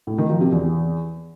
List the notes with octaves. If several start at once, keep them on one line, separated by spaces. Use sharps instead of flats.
A2
D#3
F3
C3
E2